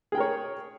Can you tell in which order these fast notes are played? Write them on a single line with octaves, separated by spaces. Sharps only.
G#4 G5 A#4 C#5